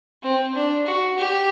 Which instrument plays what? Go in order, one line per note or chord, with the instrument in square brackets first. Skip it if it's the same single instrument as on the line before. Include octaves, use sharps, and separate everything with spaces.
[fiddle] C4
D4
F#4
G4